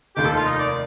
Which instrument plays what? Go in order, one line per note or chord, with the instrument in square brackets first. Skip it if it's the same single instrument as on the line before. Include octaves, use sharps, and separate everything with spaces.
[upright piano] F1 D#2 D#3 [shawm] G4
[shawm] A4
F4
D#4
D5